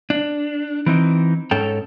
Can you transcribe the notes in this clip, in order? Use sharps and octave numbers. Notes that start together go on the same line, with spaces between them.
D4
E3 C4 D#4
G#2 C#4 A4 C#5 G5